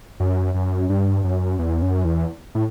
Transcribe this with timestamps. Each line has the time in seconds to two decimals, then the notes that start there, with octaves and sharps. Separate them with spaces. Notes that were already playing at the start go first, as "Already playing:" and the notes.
0.20 F#2
0.54 F#2
0.89 G2
1.24 F#2
1.59 E2
1.82 F#2
2.05 E2
2.55 A2